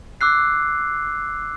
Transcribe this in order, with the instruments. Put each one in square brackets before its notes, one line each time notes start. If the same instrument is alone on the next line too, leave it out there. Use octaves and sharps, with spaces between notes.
[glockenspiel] D6 E6 F#6 C7